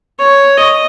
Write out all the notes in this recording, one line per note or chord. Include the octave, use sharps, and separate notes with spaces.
C#5
D#5